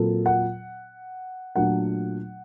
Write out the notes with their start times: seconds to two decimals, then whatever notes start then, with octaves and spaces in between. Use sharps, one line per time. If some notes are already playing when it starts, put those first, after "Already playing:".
Already playing: A#2 F#3 C4 A4
0.26 F#5
1.56 A#2 F#3 A3 D4 F#5